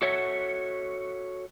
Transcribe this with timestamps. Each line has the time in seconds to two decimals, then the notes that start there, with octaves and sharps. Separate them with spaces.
0.02 F#4 A4 C#5 E5 F#5